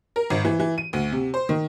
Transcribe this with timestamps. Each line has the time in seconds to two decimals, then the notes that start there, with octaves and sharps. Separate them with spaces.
0.16 A#4
0.30 G#1
0.45 E3
0.60 E3
0.78 D#7
0.93 D2
1.12 C3
1.34 C5
1.49 D#3